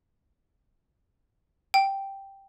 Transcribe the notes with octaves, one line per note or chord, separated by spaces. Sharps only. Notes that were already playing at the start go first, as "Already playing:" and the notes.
G5